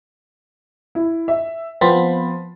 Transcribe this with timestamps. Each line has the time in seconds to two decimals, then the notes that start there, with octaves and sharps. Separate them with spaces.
0.95 E4
1.28 E5
1.81 F3 B3 C4 B5 C6 A6